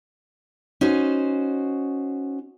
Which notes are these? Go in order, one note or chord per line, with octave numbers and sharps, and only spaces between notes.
C#4 D#4 F#4 C5